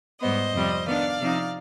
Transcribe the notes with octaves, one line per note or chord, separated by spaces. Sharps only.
G#2 G3 B3 C5 D#5
F2 C3 G3
D#3 B3 D4 D5 F5
C3 F3 C4 D#4